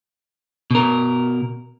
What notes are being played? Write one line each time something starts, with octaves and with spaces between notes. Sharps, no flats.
B2 A#4